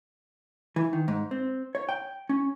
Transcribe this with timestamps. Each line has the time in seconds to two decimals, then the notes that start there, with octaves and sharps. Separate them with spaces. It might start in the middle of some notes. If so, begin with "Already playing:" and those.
0.76 E3
0.93 D#3
1.08 G#2
1.31 C4
1.75 C#5
1.89 G5
2.29 C#4